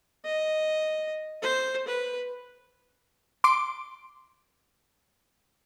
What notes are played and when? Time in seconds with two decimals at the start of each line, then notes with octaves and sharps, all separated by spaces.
0.25 D#5
1.42 C5
1.87 B4
3.44 C6 D6 D7